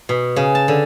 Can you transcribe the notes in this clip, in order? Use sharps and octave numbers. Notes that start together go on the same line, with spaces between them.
B2
C#3
A5
D3